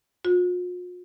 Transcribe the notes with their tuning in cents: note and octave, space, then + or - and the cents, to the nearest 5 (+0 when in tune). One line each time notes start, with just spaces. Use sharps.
F4 +45